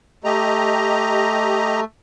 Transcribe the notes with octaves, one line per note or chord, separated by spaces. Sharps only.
A3 G4 D#5 A#5